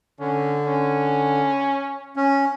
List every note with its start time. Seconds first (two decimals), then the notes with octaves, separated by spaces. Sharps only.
0.20 D3 C#4
0.65 C#4
2.16 C#4